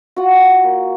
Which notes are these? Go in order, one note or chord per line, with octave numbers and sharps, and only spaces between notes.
F4 F#4 F#5
A#3